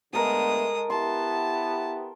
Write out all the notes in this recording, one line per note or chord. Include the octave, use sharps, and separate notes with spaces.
D3 G#3 A3 B3 A4 A#4 A#5 D#6
B3 E4 G4 A5 C6